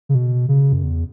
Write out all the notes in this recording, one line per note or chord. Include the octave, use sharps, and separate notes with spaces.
C#3
B2
C#3
F#2
E2